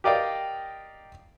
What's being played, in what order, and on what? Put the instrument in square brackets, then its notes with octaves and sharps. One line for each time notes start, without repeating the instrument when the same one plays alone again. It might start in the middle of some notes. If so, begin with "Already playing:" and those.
[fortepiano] G4 A#4 D5 D#5 F5 G5